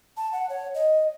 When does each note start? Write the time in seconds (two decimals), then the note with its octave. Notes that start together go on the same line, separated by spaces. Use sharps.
0.17 A5
0.32 F#5
0.49 C#5
0.74 D#5